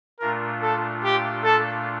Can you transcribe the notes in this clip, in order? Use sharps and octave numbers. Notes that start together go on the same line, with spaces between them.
A#2 A3 D4 F4 A#4
A4
G4
A4